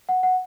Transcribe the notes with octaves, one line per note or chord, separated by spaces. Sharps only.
F#5
F#5